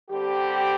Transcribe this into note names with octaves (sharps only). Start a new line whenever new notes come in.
D3 G3 C4 G4